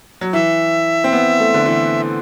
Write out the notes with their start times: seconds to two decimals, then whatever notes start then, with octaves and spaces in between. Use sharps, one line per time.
0.21 F#3
0.33 E3 E5
1.04 C4
1.13 B3
1.40 A3
1.54 D3
1.66 E3